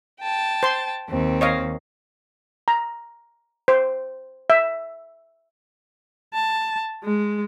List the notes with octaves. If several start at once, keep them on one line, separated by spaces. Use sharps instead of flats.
G5 A5
C5 C6
D#2 C4
C#5 D#5 F5
A#5
C5
E5
A5
G#3